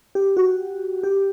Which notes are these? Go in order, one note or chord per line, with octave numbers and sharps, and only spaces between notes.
G4
F#4
G4